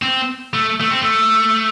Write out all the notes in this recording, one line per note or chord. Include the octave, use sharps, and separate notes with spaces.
C4
A3
A3
C4
A3